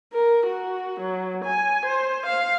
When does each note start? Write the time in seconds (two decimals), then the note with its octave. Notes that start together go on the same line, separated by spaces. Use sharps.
0.13 A#4
0.46 F#4
1.00 F#3
1.44 G#5
1.86 C5
2.26 F5